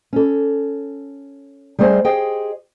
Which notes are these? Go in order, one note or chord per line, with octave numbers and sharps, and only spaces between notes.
C#4 A4
G3 A3 G#4 C5 D#5 G#5
G4 G#4 C5 D#5 G5